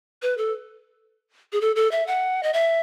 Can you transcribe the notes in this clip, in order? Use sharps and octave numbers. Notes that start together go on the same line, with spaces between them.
B4
A4
G#4
A4
A4
E5
F#5
D#5
E5